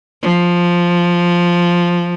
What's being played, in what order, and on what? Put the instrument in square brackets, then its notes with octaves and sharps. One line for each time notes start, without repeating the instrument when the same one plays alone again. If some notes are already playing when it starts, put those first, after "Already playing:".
[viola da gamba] F3